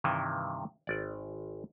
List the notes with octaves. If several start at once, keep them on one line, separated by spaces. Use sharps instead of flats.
G2 C3 D#3 E3
G#1 D5